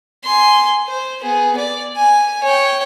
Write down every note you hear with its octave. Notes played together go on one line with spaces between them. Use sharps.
G#5 C6
C5
B3 G#4
D5
G#5
C#5 G5